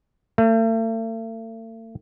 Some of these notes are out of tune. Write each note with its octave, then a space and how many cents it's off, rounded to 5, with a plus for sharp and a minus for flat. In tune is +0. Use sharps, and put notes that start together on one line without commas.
A3 +40